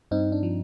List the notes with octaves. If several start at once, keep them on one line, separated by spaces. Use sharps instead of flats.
G2 C4 D#4
D4
F3